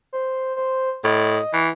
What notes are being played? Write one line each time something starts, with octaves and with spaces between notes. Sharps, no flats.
C5
C5
A2 D#5
E3